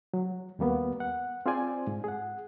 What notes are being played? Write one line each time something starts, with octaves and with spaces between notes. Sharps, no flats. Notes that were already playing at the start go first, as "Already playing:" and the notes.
F#3
D#2 G3 A#3 B3
F#5
C4 F4 G#4 C5 D5 G#5
G#2
G#4 F#5